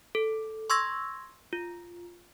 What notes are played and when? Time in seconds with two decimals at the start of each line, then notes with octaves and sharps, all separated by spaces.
0.15 A4
0.70 C6 C#6 E6 G#6 A#6
1.53 F4